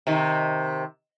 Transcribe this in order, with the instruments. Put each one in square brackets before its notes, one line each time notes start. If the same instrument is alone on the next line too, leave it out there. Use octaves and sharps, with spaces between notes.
[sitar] C3 D#3